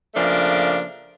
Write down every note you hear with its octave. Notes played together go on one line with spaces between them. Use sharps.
C#3 F3 A3 A#3 D4